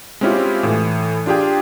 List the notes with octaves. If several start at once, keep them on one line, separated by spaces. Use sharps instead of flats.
G#3 C4 C#4 E4 F4 G4
A2 E3
D4 F4 G4 G#4 G5